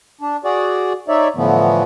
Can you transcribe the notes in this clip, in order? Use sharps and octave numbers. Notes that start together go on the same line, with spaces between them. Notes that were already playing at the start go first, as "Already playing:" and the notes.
D4
F#4 G#4 D5
D#4 C#5 D5 E5
A2 D3 E3 F3 A3 B3